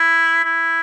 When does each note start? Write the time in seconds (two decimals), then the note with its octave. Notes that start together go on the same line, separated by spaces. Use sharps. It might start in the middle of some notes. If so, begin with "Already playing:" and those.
Already playing: E4
0.44 E4